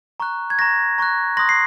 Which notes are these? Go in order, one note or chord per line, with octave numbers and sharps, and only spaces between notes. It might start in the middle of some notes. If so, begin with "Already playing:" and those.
A#5 C#6 F#6
G#6
A#5 C#6 F#6 A#6
A#5 C#6 F#6
C6 D#6 F#6 A#6
C7